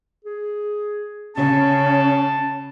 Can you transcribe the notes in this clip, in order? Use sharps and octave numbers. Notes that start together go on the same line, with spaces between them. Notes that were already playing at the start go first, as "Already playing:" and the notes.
G#4
C#3 C#4 A5